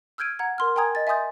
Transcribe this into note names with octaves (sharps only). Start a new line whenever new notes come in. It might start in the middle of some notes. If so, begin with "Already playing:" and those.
E6 F6 G6 G#6 D7 D#7
F#5 A#5 G#6
A#4 C6 F6
A#4 G5 G#5 A#5 D#6 G#6
D#5 A6
E5 G#5 C6 D#6 G6 A6